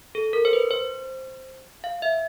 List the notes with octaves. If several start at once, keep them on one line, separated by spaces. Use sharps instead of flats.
A4
A#4
C5
B4
C5
F5
E5